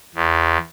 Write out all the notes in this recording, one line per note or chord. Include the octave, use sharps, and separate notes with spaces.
E2